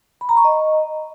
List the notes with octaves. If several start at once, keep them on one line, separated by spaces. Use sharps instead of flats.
B5
A#5
C#6
D#5